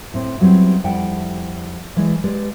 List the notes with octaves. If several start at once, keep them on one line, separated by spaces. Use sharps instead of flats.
A2 C4
F#3 G3 B3 C4 E4
F2 G3 E4 D5 F#5 G5
E3 G#3 E4 D5
G#3 G4 B4 D5